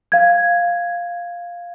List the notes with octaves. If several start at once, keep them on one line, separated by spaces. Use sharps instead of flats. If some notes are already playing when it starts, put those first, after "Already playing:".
F5 G#6